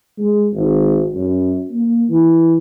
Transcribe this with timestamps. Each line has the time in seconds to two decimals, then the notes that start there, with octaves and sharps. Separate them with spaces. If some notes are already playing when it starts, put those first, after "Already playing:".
0.18 G#3
0.53 G#1
1.14 F#2
1.71 A#3
2.09 E3